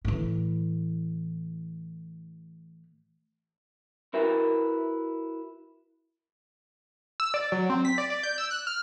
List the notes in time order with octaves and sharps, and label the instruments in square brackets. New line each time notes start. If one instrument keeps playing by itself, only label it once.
[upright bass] A2 E3
[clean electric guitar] E4 F#4 A#4 B4 E5
[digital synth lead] E6
D5
F#3
C4
B6
D5
D5
G6
E6
F#6
F6